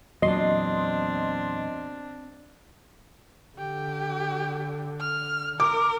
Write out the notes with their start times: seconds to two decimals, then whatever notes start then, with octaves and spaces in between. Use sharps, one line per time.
0.22 E2 A#2 F#3 C4 D4 D#5 C6
3.58 D3 G4
5.01 F6
5.60 A#4 D6